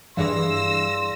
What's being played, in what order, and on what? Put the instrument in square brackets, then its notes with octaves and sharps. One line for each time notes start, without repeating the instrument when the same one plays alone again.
[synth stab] G2 E3 [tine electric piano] G#4 D5 F5 [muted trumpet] C6 [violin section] E6 A#6